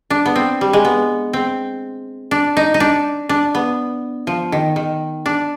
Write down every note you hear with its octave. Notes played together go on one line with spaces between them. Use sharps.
D4
B3
C4
G3
G#3
B3
C4
D4
D#4
D#4
D4
D4
B3
F3
D#3
D#3
D4